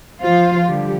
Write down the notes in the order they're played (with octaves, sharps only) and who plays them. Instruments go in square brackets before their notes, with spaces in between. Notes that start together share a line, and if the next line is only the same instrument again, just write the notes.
[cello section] F3 F4 C5 F5
D3 F3 G3 G4